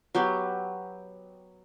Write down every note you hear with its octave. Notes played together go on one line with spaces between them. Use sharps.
F#3 B3 G4 G5